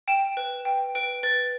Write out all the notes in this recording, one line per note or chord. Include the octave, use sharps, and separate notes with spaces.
G5 E7
B4
G5
B4 D7
B4 A6